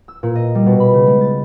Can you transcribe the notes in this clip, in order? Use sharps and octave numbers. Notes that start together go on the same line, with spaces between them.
E6
A#2
D#5
G3
B2
B5
C#3
G#3
A6